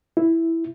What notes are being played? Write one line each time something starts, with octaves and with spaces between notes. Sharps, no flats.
E4